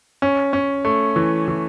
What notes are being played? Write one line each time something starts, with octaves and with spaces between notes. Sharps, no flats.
C#4
C#4
A3
E3
E3